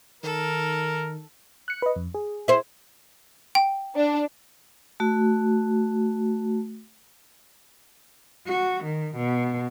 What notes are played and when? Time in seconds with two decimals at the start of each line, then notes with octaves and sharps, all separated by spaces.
0.23 D#3 A4 A#4
1.68 F#6 C#7
1.82 B4 D#5
1.96 F2
2.15 G#4
2.48 E4 C5
3.55 G5
3.95 D4
5.00 A3 F#4
8.47 F#4
8.84 D#3
9.16 B2